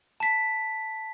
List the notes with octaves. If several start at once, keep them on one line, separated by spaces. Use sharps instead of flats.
A5 B6